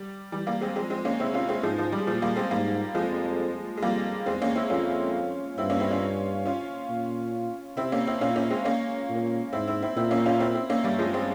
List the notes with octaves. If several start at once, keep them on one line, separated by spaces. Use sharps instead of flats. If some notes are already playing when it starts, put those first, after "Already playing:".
Already playing: G3
E3 G3
G3 A#3
G#3 C4
F3 G#3 C4
G#3 C4
A#3 C#4
C3 C4 E4
C#4 F4
G#3 C4
G#2 F3 G#3
F3
G3
A#2 F3 G#3
G3 A#3
G#3 C4
G#2 G3 A#3
F2 F3 G#3
G#3
F2 G3 A#3
E2 G#3 C4
A#3 C#4
C4 E4
F2 C#4 F4
G2 C4 E4
A#3 C#4
C4 E4
C#4 F4
C#4 F4
A#2
C3 C4 E4
A#3 C#4
C4 E4
A#2 C#4 F4
A#3 C#4
G#3 C4
A#3 C#4
A#2
G#2 C4 E4
C4 E4
C4 E4
A#2 C4 E4
A#3 C#4
C#4 F4
C4 E4
C4 E4
A#3 C#4
G2 G3 A#3
F3 G#3
G#3 C4